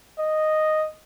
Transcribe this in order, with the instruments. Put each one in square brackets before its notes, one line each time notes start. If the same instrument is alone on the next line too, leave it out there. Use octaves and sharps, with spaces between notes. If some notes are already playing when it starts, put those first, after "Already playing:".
[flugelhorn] D#5